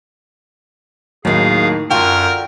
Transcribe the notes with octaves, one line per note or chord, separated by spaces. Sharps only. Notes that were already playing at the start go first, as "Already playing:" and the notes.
D#2 A2 D#3 F#3 G#4 F5
F#2 D3 F4 F#4 A#4 G5